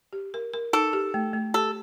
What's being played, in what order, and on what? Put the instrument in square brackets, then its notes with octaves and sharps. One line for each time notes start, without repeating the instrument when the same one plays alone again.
[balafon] G4
A#4
A#4
[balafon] D#4 [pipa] A4
[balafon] G4
A3
A3
[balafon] G4 [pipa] A4